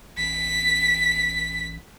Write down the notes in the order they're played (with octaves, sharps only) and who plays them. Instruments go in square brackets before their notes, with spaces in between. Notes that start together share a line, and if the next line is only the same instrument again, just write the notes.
[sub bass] A1 [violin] B6